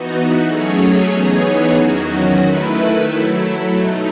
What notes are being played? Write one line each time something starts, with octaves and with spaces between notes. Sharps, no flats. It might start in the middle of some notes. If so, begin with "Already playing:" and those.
Already playing: E3 B3 D#4 F#4
F#3 A3 C#4 G#4 C#5
E3 B3 D#4 G#4 C#5
E2 D#3 F#3 C#4 F#4
D#3 A3 E4 B4
F#3 A3 E4
B2 A3 D#4